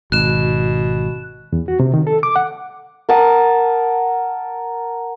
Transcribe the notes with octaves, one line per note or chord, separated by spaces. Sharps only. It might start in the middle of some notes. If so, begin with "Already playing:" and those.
G#1 B2 F#6 E7
E2
F#4
C3
D#3
A4
D6
F#5
A#4 F#5 A5 D#6